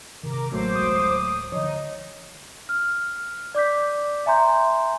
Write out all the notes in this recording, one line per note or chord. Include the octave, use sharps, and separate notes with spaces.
C3 D#3 A#4 D6
A1 F#3 A3 A#3 C5 D6
D1 G#3 D#6
D3 F3 D#4 C#5 D#5
F6
D5 D6 G6 B6
E5 G#5 A#5 C6 G6